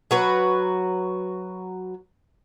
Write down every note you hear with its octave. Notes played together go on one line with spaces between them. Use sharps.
F#3 F#4 B4